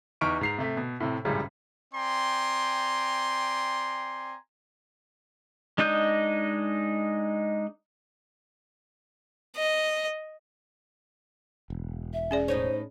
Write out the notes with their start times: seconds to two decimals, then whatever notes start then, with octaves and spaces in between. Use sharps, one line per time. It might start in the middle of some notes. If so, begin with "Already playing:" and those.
0.21 E2 D#4 C#6 F6 D7
0.41 G#2 C7 F7
0.59 C3 A3 B6
0.77 B2
1.00 A2 C3
1.25 G#1 C#2 F#2 A2 G3 G#3
1.94 C4 D5 G5 G#5 A#5 C6
5.78 G#3 D4 D#4 D#5 G6
9.57 D#5
11.70 E1
12.13 E5
12.31 C#4 G#4 D5
12.48 A2 D#4 C5 C#5